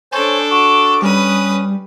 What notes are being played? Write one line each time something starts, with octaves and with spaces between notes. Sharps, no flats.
D4 A4 C5 C#5 G#5
F#4 D6
G3 C#4 B4 D#6